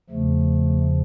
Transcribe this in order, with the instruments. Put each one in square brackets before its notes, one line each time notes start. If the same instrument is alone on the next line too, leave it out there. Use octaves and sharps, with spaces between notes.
[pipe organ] E2 C#3 F3 A3